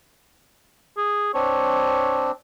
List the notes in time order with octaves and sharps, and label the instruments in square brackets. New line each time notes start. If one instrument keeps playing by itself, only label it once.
[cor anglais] G#4
[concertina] C4 D4 [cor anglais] C#5